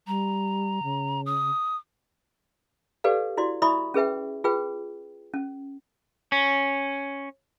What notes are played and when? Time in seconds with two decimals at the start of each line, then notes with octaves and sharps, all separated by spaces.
0.07 G3 A#5
0.83 C#3
1.26 D#6
3.04 G4 A4 B4 D5 F5
3.37 E4 F#4 D5 C6
3.62 E4 D5 E5 B5 C#6 D#6
3.94 C#4 G#4 B4 E5 G5
4.44 F4 G#4 B4 G5
5.34 C#4
6.32 C#4